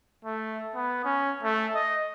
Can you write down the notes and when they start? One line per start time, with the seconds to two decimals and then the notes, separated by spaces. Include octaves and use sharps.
0.25 A3
0.75 B3
1.05 C#4
1.43 A3
1.75 D#5